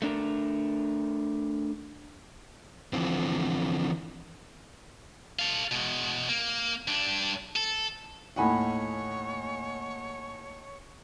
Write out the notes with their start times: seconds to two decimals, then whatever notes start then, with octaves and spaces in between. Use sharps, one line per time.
0.02 A3 D4 A#4
2.93 D3 E3 F3 C4
5.39 A4 F5
5.71 B2 G#3
6.29 A#3
6.88 G2 D4
7.56 A4
8.36 D#2 A2 D#3 C#5 F#5 G#5 B5